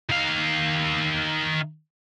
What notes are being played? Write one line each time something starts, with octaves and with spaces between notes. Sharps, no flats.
D#3 F5